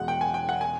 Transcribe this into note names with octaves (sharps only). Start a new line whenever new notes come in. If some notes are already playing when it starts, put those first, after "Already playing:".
Already playing: E2 B2 G#3 F#5
G5
G#5
G5
F#5
G#5